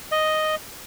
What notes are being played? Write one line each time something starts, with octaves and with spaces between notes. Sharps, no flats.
D#5